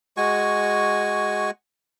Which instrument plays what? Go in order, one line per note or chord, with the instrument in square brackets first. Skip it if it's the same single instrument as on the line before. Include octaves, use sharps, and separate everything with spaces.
[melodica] G#3 F#4 G#5 C#6